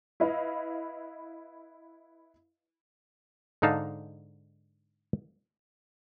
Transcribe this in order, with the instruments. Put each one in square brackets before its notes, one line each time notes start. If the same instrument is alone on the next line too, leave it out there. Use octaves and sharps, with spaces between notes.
[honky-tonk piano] E4 B4 D#5 F5
[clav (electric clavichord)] G#2 D3 D#4 F5 A5